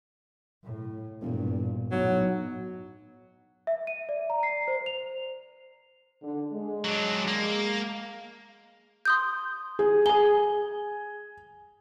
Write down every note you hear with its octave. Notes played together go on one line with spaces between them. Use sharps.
A2
E1 G2 A#2
B1 A2 F#3
E5
D#7
D5
A#5
C7
C5
F7
D3
G#3
F#3 D4
A#3
C6 D#6 G6
G#4
G#4 G#5 G7